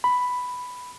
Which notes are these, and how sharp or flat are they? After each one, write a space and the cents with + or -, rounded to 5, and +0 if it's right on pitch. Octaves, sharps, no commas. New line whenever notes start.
B5 +5